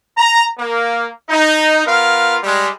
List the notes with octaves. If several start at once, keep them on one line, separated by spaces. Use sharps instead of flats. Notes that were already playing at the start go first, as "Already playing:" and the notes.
A#5
A#3
D#4
B3 F4 A#4 F5
G3 G#3